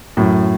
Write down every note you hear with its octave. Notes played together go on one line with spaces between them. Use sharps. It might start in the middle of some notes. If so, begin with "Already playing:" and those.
F#2 A2